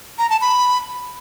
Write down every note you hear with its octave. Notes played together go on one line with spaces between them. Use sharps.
A#5
A5
B5